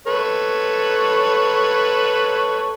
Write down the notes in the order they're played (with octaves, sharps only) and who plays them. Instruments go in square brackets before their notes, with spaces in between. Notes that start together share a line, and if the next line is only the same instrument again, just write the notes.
[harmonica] A4 B4 C#5